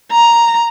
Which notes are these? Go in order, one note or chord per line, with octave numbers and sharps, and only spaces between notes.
A#5